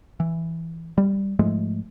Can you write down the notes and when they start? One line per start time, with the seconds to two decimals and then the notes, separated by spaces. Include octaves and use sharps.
0.20 E3
0.98 G3
1.39 G#2 F3 G#3 A3